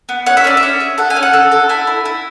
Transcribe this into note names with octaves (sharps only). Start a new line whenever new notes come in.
B3
C#4 F#5
E5
C#4 D5
E5
C#4
G#4
A4 F#5
G#5
C#4
F#5
A4
A4
E4 G#5
E4
E4